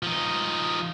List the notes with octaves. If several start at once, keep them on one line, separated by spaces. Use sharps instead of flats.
F3 D#4